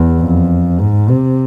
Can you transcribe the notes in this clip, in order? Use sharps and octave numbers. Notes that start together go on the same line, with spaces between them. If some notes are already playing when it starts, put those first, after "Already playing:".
Already playing: E2
F2
G#2
C3